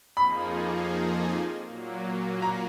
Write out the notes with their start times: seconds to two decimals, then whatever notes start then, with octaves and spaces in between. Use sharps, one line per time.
0.16 F2 F3 A#3 D#4 G#4 B5
1.67 A#2 F#3 A#3
2.42 A#5